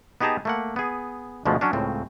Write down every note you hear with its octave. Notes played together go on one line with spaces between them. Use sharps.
B3 D#4 G4 G#4 A5 A#5
A3 A#3 F#5
B3 G#4
D2 B2 F3 G#3 A3
F#3 C#4 D4
C#2 A2 C#3 C4